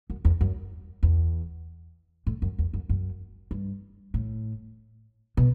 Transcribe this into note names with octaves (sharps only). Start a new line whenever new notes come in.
F#2
E2
F#2
E2
A2
F#2
E2
F#2
F#2
G2
A2
B2